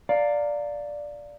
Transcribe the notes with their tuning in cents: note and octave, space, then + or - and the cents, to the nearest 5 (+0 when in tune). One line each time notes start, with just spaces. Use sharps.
D5 +0 F5 +10 A#5 -35